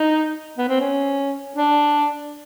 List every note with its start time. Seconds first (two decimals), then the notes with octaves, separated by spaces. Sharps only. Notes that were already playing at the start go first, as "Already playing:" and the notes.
Already playing: D#4
0.58 B3
0.69 C4
0.80 C#4
1.56 D4